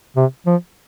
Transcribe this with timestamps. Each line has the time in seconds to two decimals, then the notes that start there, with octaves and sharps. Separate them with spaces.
0.16 C3
0.46 F3